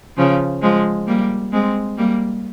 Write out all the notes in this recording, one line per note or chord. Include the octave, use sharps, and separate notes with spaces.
C#3 F3
F3 G#3
G3 A#3
G#3 C4
G3 A#3